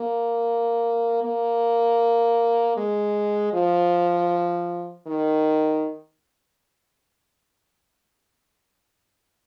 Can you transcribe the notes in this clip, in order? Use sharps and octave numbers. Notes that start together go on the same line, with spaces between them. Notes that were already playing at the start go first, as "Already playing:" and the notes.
Already playing: A#3
A#3
G#3
F3
D#3